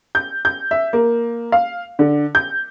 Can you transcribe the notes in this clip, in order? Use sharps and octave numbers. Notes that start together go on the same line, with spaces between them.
G6
G6
E5
A#3
F5
D3
G6